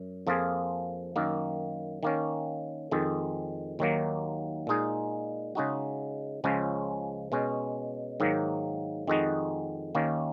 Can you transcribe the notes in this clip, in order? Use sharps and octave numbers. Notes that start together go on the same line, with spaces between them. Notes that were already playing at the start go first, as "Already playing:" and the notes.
Already playing: F#2
F2 F3 A#3 F4 G#4
F#2 D#3 A#3
D#3 A#3 C#4
F2 D#3 G#3
D#2 D#3 F#3 A#3
A#2 G#3 D#4 G#4
C#3 G#3 D#4 F#4
C#2 C#3 F3 G#3 C#4
B2 G#3 C#4
G#2 D#3 F#3 A#3
F2 D#3 G#3 D#4 F#4
D#2 D#3 A#3 C#4